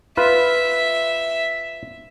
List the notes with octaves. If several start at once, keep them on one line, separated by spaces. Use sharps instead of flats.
F4 B4 E5